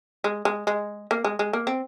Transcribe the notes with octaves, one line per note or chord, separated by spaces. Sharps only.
G#3
G#3
G#3
A#3
G#3
G#3
A#3
C4